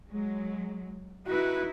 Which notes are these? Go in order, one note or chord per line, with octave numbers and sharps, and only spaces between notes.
F#3 G#3
D#4 E4 F#4 B4